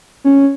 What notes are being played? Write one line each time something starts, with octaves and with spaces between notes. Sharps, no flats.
C#4